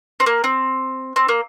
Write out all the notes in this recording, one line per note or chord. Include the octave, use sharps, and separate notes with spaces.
C4
A#3
C4
C4
A#3